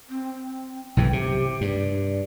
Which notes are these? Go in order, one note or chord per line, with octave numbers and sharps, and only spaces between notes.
C4
B1 G2 E3 G5
C3 G4
G2 D5